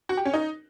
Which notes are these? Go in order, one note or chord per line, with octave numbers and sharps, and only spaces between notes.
F#4
G4
C#4
D#4